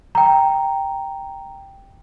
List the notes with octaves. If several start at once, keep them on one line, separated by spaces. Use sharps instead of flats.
G5 A#5